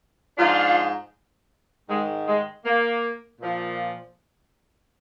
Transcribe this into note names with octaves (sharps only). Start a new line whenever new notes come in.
G#2 F3 D4 F4
G#2 D#3 G#3
G#3
A#3
A#2 F3